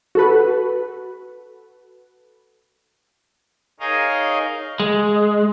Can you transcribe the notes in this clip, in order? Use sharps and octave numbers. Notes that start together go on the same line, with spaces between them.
F#4 A4 B4
D#4 G#4 A#4 C#5 D#5 F5
G#3